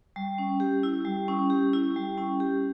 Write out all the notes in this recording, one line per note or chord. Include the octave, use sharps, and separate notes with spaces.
G3
C#4
G4
E4
G3
C#4
G4
E4
G3
C#4
G4